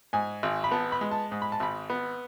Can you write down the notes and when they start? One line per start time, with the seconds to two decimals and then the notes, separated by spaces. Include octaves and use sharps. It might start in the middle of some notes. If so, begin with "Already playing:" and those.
0.13 G#2 G#5
0.43 G#1
0.64 B5
0.72 B3 A5
0.92 B5
1.01 G#3
1.11 A5
1.32 G#2
1.42 B5
1.52 A5
1.60 G#1 B5
1.90 B3